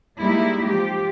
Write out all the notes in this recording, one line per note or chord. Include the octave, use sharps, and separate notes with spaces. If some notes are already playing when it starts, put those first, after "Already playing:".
G3 G#3 A#3 D#4 E4
F3 G4